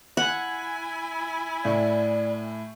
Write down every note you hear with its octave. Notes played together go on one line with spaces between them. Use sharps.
E4 F#5 G#5
A2 D5